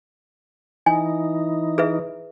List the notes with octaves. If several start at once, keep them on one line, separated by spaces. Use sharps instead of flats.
E3 D#4 G#5
G#4 B4 E5